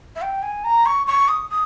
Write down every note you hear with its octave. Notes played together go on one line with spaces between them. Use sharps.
E5
G5
G#5
A#5
C#6
C#6
D#6
D#6